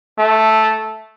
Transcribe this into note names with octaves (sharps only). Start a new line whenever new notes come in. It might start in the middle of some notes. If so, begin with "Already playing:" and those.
A3